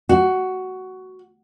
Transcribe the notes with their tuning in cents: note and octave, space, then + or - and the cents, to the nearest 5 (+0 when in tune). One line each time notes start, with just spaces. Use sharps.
F#4 +10